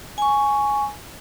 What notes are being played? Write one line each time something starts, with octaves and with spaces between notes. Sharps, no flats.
G#5 C#6